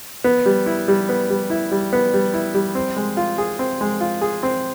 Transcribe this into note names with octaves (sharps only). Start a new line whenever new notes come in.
B3
G3
E4
G3
B3
G3
E4
G3
B3
G3
E4
G3
C4
G#3
F4
G#4
C4
G#3
F4
G#4
C4